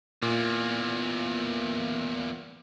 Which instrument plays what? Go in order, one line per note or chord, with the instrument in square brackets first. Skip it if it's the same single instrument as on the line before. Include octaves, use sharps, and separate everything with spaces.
[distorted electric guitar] E2 A#3 [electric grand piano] A#2